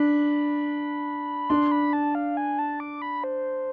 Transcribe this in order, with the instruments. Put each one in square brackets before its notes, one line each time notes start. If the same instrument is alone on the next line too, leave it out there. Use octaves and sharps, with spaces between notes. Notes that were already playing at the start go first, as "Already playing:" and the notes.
Already playing: [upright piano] D4 [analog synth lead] B5
[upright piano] D4 [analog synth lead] C6
[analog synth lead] B5
A5
F5
G#5
A5
D6
B5
C5